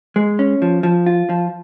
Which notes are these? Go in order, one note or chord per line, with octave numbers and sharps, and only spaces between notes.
G#3
C#4
F3
F3
F4
F3